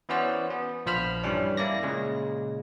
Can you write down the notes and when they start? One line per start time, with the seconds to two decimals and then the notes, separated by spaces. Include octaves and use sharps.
0.09 E3 B3 C#4 F#4 C5 D5
0.50 B3
0.86 A#1 F3 C5 B5 F6
1.23 G2 E3 G3 C#4 D4
1.57 A#3 E4 D5 A#6
1.83 A#2 C#3 G#3